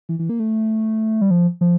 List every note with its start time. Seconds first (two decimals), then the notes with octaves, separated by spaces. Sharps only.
0.09 E3
0.19 E3
0.29 A#3
0.40 A3
1.21 G3
1.31 F3
1.61 F3